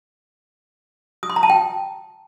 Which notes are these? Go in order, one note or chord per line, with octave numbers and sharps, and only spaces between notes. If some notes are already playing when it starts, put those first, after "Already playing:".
D#6
C6
A#5
A5
G5